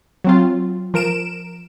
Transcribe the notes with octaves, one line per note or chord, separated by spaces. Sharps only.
F#3 C4 F4
F3 A#4 D7 E7